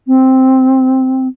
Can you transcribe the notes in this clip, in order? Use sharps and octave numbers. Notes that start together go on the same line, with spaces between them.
C4